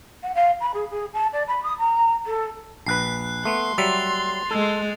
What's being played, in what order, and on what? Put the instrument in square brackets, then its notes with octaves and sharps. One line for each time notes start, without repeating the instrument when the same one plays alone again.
[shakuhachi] F#5
F5
B5
G#4
G#4
A5
D5
B5
D#6
A#5
A4
[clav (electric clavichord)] A#1 B4 [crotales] F#6 C7
[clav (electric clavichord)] A3 B3 [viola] C6 [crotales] C7
[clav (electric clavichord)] F#3 G3 E5 [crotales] A6 F7
[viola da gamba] G#3 [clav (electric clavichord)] A4